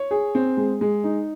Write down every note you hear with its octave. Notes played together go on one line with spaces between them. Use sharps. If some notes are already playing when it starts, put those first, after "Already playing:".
Already playing: C#5
G#4
C4
G#3
G#3
D#4